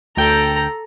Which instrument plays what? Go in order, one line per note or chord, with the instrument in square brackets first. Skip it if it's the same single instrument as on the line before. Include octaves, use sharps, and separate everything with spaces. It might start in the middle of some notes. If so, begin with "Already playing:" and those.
[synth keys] D2 G5 [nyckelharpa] A4 A#5